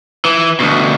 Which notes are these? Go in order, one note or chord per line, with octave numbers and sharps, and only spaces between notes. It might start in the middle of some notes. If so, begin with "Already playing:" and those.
E3
D2 B2